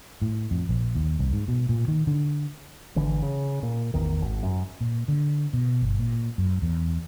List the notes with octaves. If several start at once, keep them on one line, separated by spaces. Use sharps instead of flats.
A2
F2
A#1
D#2
C2
G#2
B2
A#2
D#3
D3
G#1 D3 E3
C#3
A#2
A1 E2 D#3
G#1
F#2
A#2
D3
B2
G1
A#2
F#2
E2